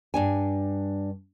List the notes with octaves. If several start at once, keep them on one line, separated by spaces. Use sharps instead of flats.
G2 D4 G#5